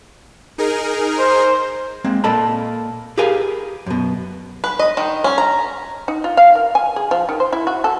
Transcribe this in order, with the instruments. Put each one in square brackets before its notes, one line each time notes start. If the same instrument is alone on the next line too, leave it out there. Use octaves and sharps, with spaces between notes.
[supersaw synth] D#4 G#4 A#4
[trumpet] C5
[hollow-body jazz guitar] G#3 A#3 C4
A#2 A#3 A4 D#5 A5 B5
G4 G#4 A#4 B4 F5 G#5
F#2 B2
[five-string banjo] B4
D#5
D#3
C#4
A#5
[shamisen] D#4
F4
F5
A#4
G#5
G#4
F3
D#3
C5
E4
F#4
A4